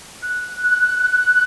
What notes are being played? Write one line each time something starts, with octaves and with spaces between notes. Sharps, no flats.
F#6